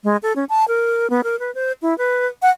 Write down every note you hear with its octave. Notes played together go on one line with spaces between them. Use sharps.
G#3
A4
C#4
A5
A#4
B3
A#4
B4
C5
E4
B4
F#5